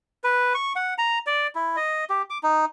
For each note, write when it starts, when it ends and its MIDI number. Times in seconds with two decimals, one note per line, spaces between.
0.24 0.53 71
0.55 0.73 85
0.76 0.94 78
0.98 1.19 82
1.26 1.47 74
1.55 1.76 64
1.76 2.04 75
2.10 2.22 67
2.30 2.38 86
2.43 2.65 63